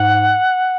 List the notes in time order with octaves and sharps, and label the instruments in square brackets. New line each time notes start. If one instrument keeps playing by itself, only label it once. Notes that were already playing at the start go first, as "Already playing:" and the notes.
Already playing: [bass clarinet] G#2 [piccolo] F#5